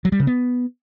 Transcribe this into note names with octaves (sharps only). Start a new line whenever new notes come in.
F#3
G3
C#3
B3